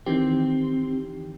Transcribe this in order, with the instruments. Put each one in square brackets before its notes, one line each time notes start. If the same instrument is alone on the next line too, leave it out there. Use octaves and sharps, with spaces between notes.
[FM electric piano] D#3 E3 G4 [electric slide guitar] C4